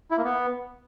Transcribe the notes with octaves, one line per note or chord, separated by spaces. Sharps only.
E4
A#3
B3